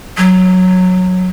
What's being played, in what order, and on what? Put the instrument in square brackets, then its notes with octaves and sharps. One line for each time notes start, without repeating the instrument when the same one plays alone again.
[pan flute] F#3